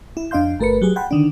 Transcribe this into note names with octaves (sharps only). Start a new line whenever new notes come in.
E4
F2 D4 D#5 F5 C6 G6
G1 A3 A#4 B4 C#7
F#3 G4 G#4
F#5 G5 A5 B5 C6
D3 D#3 D4